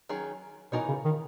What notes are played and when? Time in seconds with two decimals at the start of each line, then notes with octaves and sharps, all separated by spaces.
0.09 D#3 F#3 C#4 G#4
0.72 B2 E3 B3 D#4 A#4 C#5
0.88 C#3
1.05 D#3